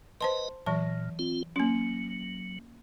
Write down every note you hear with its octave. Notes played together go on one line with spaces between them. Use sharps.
B4 C5 D#5 A5 C6
A#2 E3 F#3 A5
C4 F4
F#3 A#3 C#4